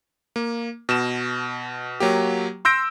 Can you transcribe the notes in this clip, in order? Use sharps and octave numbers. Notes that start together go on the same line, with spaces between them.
A#3
B2 E7
F#3 A#3 G4
C6 E6 G6 A#6 D7